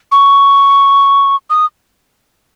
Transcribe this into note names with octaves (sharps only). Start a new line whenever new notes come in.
C#6
D#6